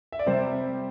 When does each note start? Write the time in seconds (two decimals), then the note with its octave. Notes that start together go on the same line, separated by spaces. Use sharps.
0.12 E5
0.19 D5
0.26 C3 G3 C5